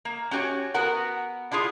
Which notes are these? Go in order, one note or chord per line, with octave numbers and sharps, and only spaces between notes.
A#3
C#4 F#4 G4 C#5 G#5
B3 F#4 A#4 F#5
D4 E4 F4 G#4